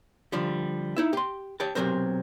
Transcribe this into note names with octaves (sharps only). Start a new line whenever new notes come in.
D3 F3 G3
D#4 E4 E5
G4 C6
G4 C#5 G5 A5
B1 G#2 C3 F#3 A#4 C5